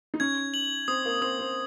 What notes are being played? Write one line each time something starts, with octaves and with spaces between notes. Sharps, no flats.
D#4
C#4 G#6
F#7
C4 D#6
A#3
C4 D#6
C4